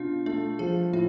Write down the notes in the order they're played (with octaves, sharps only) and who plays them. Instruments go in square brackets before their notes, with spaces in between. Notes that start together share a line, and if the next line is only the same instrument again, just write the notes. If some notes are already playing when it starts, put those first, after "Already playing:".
Already playing: [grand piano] B2 F4 [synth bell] D4
[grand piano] A3 [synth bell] D4
[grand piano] F3 [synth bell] G#4
[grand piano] A2 [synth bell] F4